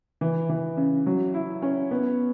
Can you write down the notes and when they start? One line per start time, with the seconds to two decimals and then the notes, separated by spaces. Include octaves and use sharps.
0.21 E3
0.49 E3
0.77 C#3
1.06 F#3
1.34 E4
1.62 C#4
1.91 B3